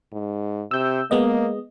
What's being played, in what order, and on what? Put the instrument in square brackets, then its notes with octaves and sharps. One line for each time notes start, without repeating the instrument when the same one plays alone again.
[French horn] G#2
[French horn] C3 [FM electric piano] E6 G6
[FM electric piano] G#3 B3 D#5 [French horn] A#3